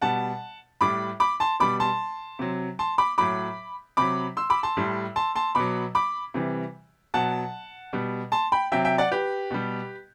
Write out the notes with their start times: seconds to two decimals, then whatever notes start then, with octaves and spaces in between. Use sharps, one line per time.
0.02 B2 G3 F#5 A5
0.81 A2 G3 B5 D6
1.20 B5 D6
1.40 A5 C6
1.60 B2 G3 B5 D6
1.80 A5 C6
2.39 C3 F#3
2.79 A5 C6
2.98 B5 D6
3.18 A2 F#3 B5 D6
3.97 C3 F#3 B5 D6
4.37 C6 E6
4.50 B5 D6
4.63 A5 C6
4.77 A2 G3
5.16 A5 C6
5.36 A5 C6
5.55 B2 F#3 B5 D6
5.95 B5 D6
6.34 C3 E3 G3
7.14 B2 F#3 F#5 A5
7.93 B2 G3
8.32 A5 C6
8.52 G5 B5
8.72 C3 F#3 E5 G5
8.85 E5 G5
8.98 D5 F#5
9.12 G4 B4
9.51 B2 G3